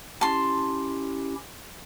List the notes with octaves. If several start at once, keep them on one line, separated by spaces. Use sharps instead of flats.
C#4 E4 G4 A5 C6